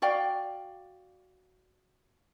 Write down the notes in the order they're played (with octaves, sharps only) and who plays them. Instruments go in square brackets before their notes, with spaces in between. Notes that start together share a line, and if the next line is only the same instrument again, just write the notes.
[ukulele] F#4 D5 F5 G5